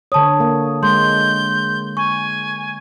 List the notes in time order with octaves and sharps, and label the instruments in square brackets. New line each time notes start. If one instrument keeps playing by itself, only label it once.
[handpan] D3 C#5 [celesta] A5 D#6
[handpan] A#3
[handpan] G#3 [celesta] C6 [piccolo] G6
[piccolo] G#5 [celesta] C#6